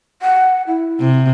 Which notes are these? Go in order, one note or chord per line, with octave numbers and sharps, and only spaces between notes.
F#5
E4
C3